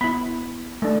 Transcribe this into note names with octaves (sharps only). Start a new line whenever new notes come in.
B3 E4 B5
A3 D4